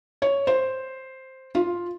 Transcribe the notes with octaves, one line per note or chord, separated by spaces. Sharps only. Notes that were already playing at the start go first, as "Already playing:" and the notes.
C#5
C5
F4